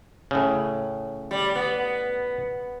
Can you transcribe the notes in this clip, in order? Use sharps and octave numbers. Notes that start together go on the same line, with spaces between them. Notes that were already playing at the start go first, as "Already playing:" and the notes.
A2 C#3
G3
B3